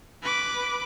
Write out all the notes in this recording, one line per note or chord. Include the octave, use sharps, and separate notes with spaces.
B4 D6